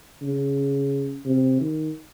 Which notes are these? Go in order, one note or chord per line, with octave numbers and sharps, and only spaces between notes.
C#3
C3
D#3